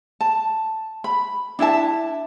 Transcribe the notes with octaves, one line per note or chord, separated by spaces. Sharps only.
A5
B5
D4 E4 E5 A5